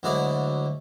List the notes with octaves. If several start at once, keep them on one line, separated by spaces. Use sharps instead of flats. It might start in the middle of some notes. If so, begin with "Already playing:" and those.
D2 D3 F#3 G#3 E4 D5